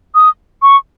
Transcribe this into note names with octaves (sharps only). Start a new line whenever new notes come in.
D#6
C#6